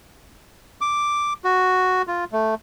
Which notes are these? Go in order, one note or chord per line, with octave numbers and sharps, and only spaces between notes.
D6
F#4
F4
A3